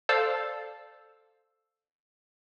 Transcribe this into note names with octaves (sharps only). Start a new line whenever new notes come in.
A4 C5 D5 F5 A5 E6